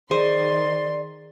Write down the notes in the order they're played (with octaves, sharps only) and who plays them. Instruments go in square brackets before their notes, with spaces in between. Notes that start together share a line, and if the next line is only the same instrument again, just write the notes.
[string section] D#3 C6 [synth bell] G#4 [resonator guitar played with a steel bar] C5 [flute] D5